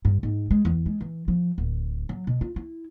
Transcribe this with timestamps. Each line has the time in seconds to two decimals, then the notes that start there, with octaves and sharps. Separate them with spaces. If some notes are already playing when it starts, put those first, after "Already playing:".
0.05 G2
0.23 G#2
0.51 G#3
0.65 E2
0.86 G#3
1.01 E3
1.28 F3
1.58 D1
2.09 F#3
2.27 B2
2.41 F4
2.56 E4